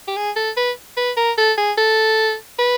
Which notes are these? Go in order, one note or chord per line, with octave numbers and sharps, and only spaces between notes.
G4
G#4
A4
B4
B4
A#4
A4
G#4
A4
B4